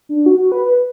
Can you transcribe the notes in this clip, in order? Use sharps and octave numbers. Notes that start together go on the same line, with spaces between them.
D4
F#4
F#4
B4
B4